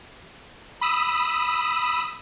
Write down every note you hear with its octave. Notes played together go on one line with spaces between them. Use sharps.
B5 D#6 E6